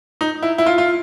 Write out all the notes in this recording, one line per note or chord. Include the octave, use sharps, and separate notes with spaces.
D#4
E4
E4
F4
F4